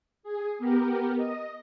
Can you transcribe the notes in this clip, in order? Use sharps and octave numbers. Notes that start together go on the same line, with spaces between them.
G#4
B3 G4 A#4
D#5